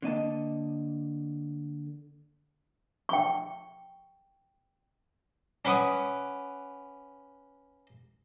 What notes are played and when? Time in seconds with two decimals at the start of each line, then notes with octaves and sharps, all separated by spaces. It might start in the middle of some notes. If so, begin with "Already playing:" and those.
0.02 D3 A#3 D#5 A5
3.09 G5 C#6
5.65 C#4 B4 F#5 D6 D#6